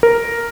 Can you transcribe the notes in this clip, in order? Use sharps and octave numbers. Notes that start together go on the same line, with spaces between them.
A#4